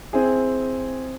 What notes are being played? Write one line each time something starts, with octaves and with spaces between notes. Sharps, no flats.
C4 E4 G#4